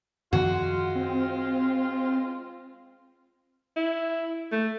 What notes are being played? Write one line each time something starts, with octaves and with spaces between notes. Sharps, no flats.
F#2 D#3 F3 G#3 F4 F#4
C4
E4
A3